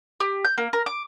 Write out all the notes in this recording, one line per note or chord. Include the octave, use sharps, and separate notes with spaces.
G4
G6
A#3
A#4
D6